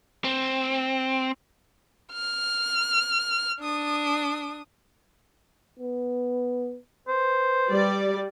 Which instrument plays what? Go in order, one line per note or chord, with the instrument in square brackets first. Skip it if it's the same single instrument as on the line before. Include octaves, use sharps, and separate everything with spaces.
[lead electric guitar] C4
[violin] F6
D4 D#6
[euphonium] B3
[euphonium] B4 [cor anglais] C5
[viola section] G3 D5